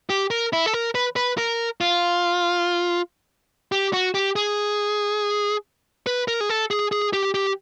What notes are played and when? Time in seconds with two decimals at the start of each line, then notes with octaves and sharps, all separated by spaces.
0.10 G4
0.31 A#4
0.53 E4
0.66 A4
0.74 A#4
0.95 B4
1.16 B4
1.38 A#4
1.81 F4
3.72 G4
3.93 F#4
4.15 G4
4.36 G#4
6.07 B4
6.28 A#4
6.41 G#4
6.49 A4
6.71 G#4
6.92 G#4
7.13 G4
7.35 G4